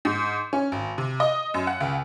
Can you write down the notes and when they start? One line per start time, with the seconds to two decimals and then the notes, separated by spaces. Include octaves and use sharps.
0.05 G#2
0.53 C#4
0.72 G#1
0.98 C3
1.20 D#5
1.54 F#2
1.67 F#5
1.80 C#2